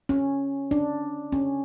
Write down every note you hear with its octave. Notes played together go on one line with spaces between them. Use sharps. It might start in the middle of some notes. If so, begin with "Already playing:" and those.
C#4
D4
C#4